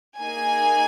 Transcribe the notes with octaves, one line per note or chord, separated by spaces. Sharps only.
A#3 D#4 G#4 G#5